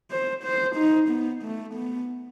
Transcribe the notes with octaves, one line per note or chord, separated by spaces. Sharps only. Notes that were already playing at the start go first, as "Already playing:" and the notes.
C5
C5
D#4
B3
A3
B3